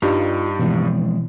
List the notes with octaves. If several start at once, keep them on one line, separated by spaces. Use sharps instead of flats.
G2 G3 D#4 F4 A#5
B2 E3 F3 G#3 C4